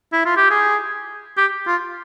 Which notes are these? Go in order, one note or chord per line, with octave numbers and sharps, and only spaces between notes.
E4
F4
G4
G#4
G4
F4